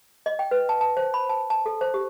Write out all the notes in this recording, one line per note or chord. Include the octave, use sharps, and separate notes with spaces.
D#5
G5
B4
A5
A5
C5
B5
A5
A5
A4
C5
G4